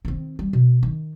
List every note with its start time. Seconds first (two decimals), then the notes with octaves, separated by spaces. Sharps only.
0.05 D#3 C4
0.39 G3
0.53 B2
0.83 D#3